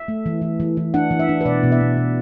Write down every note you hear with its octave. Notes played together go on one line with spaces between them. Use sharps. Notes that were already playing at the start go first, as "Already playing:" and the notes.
Already playing: E5
A3
E3
E3
E3
E3
D4 F#5
E3
E5
D4
B4
B2 D5
B2
E5
B2
B2